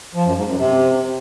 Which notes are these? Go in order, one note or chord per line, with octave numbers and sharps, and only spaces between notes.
F3
F#2
G#2
F#2
C3